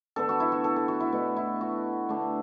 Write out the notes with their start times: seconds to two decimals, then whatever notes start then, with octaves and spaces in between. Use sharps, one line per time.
0.16 D3 B3 D4 A4
0.29 F#4
0.40 E4
0.52 F#4
0.64 A4
0.76 A4
0.88 F#4
1.00 E4
1.12 B2 A3 D4
1.37 E4
1.61 F#4
2.09 D3 A3 D4